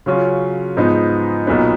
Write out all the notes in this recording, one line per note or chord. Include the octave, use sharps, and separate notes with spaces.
C#3 F#3 C#4 F4
G#2 F3 B3 D#4
B1 A#2 F#3 B3 D#4